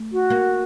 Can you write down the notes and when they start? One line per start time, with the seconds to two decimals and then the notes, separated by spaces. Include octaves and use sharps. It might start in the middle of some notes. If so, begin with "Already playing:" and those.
Already playing: A3
0.12 F#4
0.30 A#3